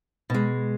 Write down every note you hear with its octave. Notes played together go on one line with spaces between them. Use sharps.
B2 G#3